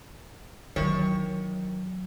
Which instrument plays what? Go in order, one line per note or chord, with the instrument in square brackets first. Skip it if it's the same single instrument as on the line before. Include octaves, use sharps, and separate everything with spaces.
[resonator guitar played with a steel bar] D#3 C#5 [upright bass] E3 F#3